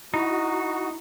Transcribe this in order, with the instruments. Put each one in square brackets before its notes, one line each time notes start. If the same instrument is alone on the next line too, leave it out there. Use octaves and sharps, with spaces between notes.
[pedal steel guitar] D#4 [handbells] E4 [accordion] F#4